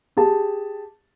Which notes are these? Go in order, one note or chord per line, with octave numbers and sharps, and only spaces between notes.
G4 G#4 A5